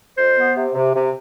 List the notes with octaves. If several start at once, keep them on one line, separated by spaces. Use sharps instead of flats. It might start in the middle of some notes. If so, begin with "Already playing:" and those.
F2 C5
B3
C3
C3
C3